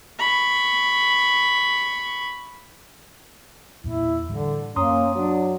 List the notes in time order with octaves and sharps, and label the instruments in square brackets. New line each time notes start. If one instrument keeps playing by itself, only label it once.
[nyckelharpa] B5 C#6
[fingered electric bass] E2 A#2 [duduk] E4
[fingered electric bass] A2 E3 G3 [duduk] D3
[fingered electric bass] F#2 [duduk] A#3 [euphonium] C#4 [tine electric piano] A#5 C6 D#6
[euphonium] F#3 [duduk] D4